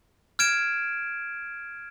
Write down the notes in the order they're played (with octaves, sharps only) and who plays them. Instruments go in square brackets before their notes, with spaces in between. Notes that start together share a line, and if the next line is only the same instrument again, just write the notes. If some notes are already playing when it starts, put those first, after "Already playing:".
[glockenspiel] F6 G#6 D7 E7